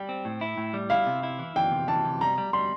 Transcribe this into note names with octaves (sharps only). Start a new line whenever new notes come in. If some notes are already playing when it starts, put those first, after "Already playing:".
Already playing: G3 G5
C4
A2
E4
A2
G3
E4 F5
C3
E4
E3
E3 G5
C3
E3 A5
C3
G3 A#5
G3
G3 C6